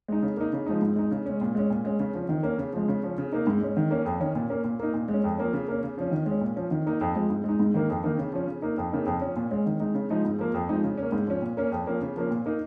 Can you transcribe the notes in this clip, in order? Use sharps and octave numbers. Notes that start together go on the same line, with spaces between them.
G#3 D#4
C#3
A#3 D#4
C#3
F3 G#3 D#4
G#2
G#3 D#4
C#3
G#3 C#4
A#2
G#3 C#4
A#2
G#3 C#4
C#3
F3 C#4
D#3
A#3 C#4
C#3
F3 G#3
C#3
F3 C#4
C#3
A#3 D#4
G#2
G#3 C#4
D#3
A#3 C#4
F2
D#3 C#4
A#2
A#3 C#4
A#2
A#3 D#4
A#2
G#3
C#4
F2
F3 A#3 C#4
C#3
A#3 C#4
C#3
F3 C#4
D#3
G#3
C#4
A#2
F3 C#4
D#3
A#3 D#4
F2
F3 G#3
G#2
G#3 D#4
G#2
D#3 A#3
F2
D#3 A#3 D#4
C#3
F3 C#4
C#3
A#3 D#4
F2
C#3 A#3 D#4
F2
F3 C#4
A#2
G#3 C#4
D#3
G#3 D#4
C#3
F3 G#3 D#4
G#2
F3 A#3
F2
F3 G#3 D#4
C#3
A#3 C#4
G#2
F3 C#4
A#2
A#3 C#4
F2
F3 A#3 C#4
C#3
F3 A#3 C#4
A#2
A#3 D#4